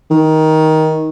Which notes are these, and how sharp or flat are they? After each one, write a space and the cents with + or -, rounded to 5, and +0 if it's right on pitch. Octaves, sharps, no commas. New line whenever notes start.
D#3 +15